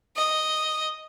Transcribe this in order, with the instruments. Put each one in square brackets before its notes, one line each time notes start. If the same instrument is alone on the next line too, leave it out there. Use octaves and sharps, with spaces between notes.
[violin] D#5